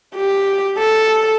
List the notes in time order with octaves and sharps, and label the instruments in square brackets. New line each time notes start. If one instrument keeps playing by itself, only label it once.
[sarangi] G4
A4